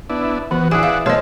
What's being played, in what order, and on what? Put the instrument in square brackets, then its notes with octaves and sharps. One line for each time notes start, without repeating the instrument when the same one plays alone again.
[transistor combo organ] B3 D4 E4
[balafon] E3 [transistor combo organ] B3 F#4
[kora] E3 G#4 [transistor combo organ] D5 E5 F#5 [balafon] G#5
[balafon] F5
[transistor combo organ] B2 A3 E6 [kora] C5 F5 [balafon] C#5 D#5